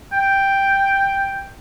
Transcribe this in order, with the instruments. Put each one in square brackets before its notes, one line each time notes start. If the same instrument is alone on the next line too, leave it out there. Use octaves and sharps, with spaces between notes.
[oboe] G5